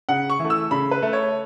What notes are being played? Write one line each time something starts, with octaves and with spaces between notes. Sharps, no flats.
C#3 F#5
C#6
E3 A3
E6
C#3 B5
B4
A3
C#5